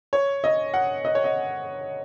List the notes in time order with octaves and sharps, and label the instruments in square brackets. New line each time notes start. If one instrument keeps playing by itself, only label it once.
[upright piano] C#5
D#5
F#5
D#5
C#5
D#5